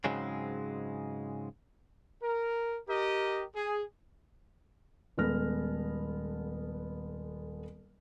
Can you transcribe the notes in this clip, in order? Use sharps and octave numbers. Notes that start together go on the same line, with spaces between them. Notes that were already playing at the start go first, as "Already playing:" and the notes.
G#2 C#3 F#3 G#3 C4
A#4
G4 A#4 D#5
G#4
D#1 G#3 B3 A4 F6 A#6